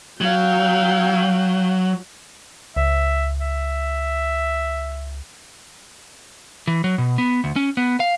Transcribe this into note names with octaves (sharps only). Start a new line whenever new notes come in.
F#3 F5 G5
C#2 E5
E5
E3
F#3
B2
B3
D2
C#4
B3
F5